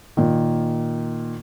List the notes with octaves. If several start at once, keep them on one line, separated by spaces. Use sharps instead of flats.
A#2 D#3